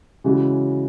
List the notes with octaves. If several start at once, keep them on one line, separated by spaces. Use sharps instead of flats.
C#3 E3 G#3 C#4 F#4